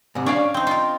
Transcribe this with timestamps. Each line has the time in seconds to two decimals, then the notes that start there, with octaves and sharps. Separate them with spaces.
0.15 G#2 C3
0.26 C#4 D4 D5 F5
0.54 C4 D#4
0.67 F4 A#4